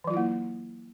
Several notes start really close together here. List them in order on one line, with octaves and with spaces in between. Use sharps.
E3 F#3 F4 E4 A#3